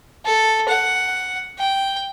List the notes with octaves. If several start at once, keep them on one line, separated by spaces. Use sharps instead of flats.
A4
F#5
G5